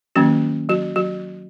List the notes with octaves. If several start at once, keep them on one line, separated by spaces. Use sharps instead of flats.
D#3 F#3 A#3 C#4 F#4
F#3 F#4
F#3 F#4